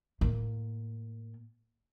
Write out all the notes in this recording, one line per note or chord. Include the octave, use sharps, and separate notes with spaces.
A2 A#3